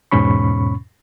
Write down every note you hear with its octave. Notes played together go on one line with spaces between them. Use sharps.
E2 G#2 B2 C#4 B5 C#6